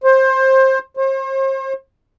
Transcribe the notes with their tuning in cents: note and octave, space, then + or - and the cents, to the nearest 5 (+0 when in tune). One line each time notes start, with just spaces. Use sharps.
C5 +20
C5 +40